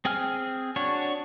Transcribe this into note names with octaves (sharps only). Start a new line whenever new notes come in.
C4 G#4 G5 G#5 F6
D4 F#4 C#5